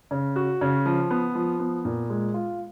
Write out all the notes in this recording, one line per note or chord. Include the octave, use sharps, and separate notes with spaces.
C#3
F#4
C#3
F3
B3
F3
B3
A#2
G#3
F4